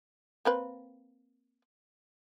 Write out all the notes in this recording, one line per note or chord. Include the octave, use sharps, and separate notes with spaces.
A#3 C4 B4